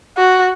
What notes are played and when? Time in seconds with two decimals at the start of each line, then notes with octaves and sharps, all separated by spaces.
0.17 F#4